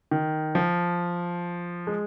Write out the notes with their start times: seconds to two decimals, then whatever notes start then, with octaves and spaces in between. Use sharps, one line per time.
0.11 D#3
0.55 F3
1.87 G#3